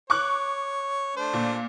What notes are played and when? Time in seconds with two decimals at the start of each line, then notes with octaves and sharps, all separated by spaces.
0.10 C#5 C#6 D6 F#6
1.16 A3 D4 C5
1.33 A#2